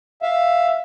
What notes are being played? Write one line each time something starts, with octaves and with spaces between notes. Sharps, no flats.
E5 F5